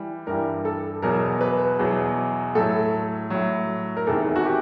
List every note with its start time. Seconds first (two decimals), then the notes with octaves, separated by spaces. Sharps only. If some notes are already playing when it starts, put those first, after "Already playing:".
Already playing: E3 G3
0.27 G2 E3 G3 A#4
0.65 A4
1.02 E2 B2 F#3 A#4
1.41 B4
1.79 E2 B2 F#3
2.55 A2 F#3 A4
3.30 A2 F#3
3.97 A#4
4.07 E2 C3 D#3 A4
4.36 F#4
4.45 G4